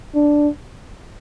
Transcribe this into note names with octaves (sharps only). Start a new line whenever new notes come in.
D4